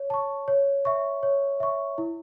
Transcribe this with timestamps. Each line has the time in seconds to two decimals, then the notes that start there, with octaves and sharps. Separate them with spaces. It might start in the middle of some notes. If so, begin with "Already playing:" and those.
Already playing: C#5
0.10 A5 C#6
0.48 C#5
0.85 E5 C#6
1.23 C#5
1.60 E5 C#6
1.98 E4